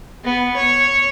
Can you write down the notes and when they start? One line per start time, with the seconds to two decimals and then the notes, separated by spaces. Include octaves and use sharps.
0.24 B3
0.56 C#5